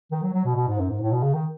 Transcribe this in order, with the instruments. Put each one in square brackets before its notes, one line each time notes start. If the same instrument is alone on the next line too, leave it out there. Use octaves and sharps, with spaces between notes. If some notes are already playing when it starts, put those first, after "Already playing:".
[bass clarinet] D#3
F#3
F#3
B2
B2
G#2
F#2
G#2
A2
B2
C#3
D#3